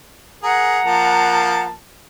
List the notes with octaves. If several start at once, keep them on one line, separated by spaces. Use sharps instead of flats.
G#4 A#4 F#5 A#5
F3 A#3 A5